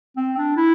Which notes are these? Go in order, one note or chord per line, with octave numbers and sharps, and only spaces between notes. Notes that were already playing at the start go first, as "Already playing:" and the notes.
C4
D4
E4